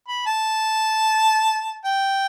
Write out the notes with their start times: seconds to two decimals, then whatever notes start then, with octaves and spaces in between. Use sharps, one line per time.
0.08 B5
0.26 A5
1.85 G5